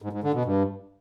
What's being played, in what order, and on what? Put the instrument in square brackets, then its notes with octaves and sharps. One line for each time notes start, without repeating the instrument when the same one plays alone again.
[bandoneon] G#2
G#2
D3
B2
G2